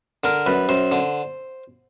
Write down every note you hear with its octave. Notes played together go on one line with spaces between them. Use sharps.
D3 A#4
F#2 B4
F#2 C5
D3